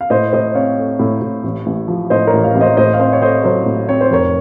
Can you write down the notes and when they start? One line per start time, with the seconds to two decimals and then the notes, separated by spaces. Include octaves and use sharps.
0.01 F5
0.10 A2 C5 D#5
0.33 A2 C5 D#5
0.54 C4 C#5 F5
0.78 A3
0.99 A2
1.22 A2
1.44 A1
1.66 A1
1.88 F3
2.10 A2 C5 D#5
2.27 A#4 C#5
2.33 A1
2.44 C#5 F5
2.55 A1
2.61 C5 D#5
2.77 A2 C5 D#5
2.94 F5
3.00 C4 C5 D#5
3.13 C#5
3.22 A3 C5 D#5
3.44 F#3 A4 C5
3.66 A2
3.89 C4 C#5
4.01 C5
4.11 F1 A#4 C#5